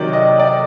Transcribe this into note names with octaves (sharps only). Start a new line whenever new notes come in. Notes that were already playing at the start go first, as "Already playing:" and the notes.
Already playing: C3 D#3 F#3 D5
D#5
D5